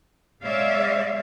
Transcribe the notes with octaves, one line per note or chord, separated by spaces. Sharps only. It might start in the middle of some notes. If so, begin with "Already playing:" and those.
G#3 C#5 D5 E5 F5